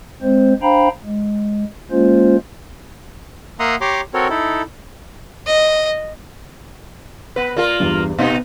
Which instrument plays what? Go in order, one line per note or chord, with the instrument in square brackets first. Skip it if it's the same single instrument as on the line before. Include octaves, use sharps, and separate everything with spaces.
[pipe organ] G#3 C4 C5
D4 C5 F5 G5 A#5 B5
G#3
G#3 A#3 C#4 F4 C5
[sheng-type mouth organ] A#3 E5 F#5 A#5 C6 D#6
G4 C#5 A#5 C6 D6
C4 F#4 A4 A#4 C#5
D#4 E4 A4
[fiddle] D#5
[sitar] B3 B4
[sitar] A#3 F4 A#4 [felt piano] D5
[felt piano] E2 G2
[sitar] B2 C4 D#4 [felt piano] B3